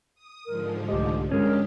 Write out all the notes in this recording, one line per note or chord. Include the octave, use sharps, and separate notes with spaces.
D#6
G#2 D3 F3 A#4
C2 A3 G4 D#5
G2 G#3 C#4 D4 G4 A#4